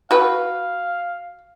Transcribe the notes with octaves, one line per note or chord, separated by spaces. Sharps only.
F#4 B4 F5